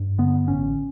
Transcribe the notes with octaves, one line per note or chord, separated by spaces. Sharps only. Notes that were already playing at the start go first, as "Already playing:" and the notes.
Already playing: G2
D3 B3
A1 C#4